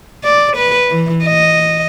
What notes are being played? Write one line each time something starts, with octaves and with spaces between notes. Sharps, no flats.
D5
B4
E3
D#5